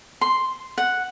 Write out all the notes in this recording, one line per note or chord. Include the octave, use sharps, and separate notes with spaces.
C6
F#5